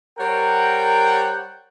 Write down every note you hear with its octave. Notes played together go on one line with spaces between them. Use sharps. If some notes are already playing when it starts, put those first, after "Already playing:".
G3 A#4 C5 C#5 F#5 G5